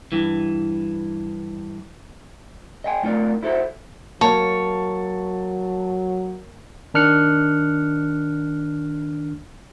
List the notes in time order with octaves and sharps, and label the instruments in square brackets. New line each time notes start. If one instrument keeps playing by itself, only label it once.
[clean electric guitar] G2 E3
D#5 G5 G#5
A3 D#4 F4 A#4 D5
E4 F#4 A4 C5 E5
[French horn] F#3 [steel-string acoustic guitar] A#3 [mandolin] C#5 [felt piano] A5
[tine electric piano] D#3 D4 F6 F#6 C#7